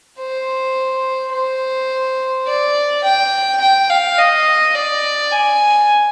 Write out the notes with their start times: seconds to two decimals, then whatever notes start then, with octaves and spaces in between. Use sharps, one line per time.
0.19 C5
1.33 C5
2.47 D5
3.04 G5
3.61 G5
3.90 F5
4.18 D#5
4.75 D5
5.32 G#5